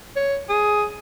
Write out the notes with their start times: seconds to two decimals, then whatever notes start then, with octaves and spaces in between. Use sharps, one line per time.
0.16 C#5
0.49 G#4